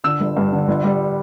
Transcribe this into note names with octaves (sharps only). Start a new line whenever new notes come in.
D3 E6
G1
G2
D3
G1
G3